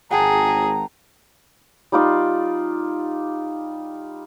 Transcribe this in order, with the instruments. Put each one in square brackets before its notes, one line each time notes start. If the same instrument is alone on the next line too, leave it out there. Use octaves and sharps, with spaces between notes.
[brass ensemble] G#1 A#5 [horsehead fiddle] G#4 [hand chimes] F#5 G5 A5
[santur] G3 D#4 F4 D5